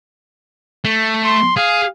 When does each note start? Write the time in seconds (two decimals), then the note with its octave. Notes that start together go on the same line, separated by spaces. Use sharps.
0.85 A3
1.24 C6
1.56 G#4 F5